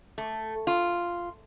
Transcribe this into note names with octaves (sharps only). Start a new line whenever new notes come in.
A3
F4